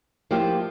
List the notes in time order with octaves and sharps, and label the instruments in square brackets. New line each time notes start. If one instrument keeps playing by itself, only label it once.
[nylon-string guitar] F3 A#3 E4 G4